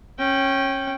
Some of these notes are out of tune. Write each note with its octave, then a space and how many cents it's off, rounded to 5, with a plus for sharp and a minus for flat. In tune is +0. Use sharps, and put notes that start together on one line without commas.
C#4 -20 G5 -5